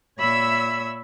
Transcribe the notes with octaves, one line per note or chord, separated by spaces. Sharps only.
A#2 C#5 E5 B5 E6